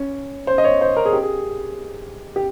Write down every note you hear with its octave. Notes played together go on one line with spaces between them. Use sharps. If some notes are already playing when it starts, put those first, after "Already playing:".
Already playing: C#4
C5
D#5
C#5
C5
A#4
G#4
G4
G#4
G4